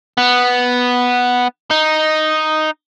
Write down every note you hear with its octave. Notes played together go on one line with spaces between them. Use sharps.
B3
D#4